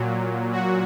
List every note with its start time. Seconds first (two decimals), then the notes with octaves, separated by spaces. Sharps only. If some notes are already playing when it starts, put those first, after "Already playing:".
Already playing: A#2 F#3
0.52 F#4